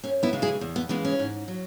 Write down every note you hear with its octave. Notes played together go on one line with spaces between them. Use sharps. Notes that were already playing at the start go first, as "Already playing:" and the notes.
F#2 C#4
B3 E4
C#3 E3 G#3
E4 G#4
E2
B3
C#3 E3 G#3 B3
C#4
G#2
F#3